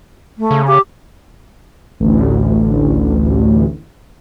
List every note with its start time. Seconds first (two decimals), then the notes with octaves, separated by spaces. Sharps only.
0.38 A3
0.51 C#3
0.67 G4
2.00 A1 D2